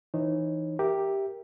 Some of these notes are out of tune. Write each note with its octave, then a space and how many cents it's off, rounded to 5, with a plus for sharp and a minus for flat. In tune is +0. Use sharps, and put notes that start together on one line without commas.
E3 -5 D#4 -15 C#5 -35
G4 +0 A#4 +0 E5 +0